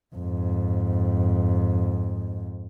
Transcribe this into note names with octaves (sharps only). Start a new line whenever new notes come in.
F2 G#2